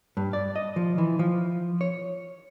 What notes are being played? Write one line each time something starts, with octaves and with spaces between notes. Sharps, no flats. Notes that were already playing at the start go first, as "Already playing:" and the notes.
G2
D5
D#5
F3
E3
F3
C#5